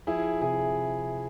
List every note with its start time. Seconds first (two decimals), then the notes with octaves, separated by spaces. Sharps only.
0.07 F3 E4 G#4
0.41 C3 E4 G#4